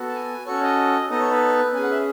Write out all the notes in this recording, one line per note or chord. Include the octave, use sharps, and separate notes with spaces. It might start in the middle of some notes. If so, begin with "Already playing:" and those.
Already playing: B3 F#4 A4
A5
G#5
C#4 F#4 A4 C#5
D#5
B3 D#4 A4 D#5
C#5
B4
C#4 G#4 G#5
F#5
E5